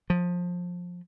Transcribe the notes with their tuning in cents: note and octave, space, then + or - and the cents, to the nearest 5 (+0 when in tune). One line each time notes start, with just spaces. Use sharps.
F3 +20